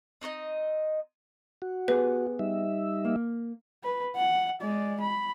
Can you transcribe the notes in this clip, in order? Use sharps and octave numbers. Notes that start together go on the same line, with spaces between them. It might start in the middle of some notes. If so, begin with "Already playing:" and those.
C4 D#4 C5 D#5
F#4
B3 G4 G#4 B4
G3 D#4 E5
A#3
B4
F#5
G#3 D5
B5